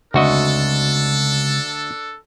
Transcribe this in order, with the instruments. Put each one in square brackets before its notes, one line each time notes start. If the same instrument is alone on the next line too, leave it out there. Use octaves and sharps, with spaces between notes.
[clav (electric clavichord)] D2 F#4 D#5 [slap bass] C#3 G#3 C4 [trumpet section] D4 A4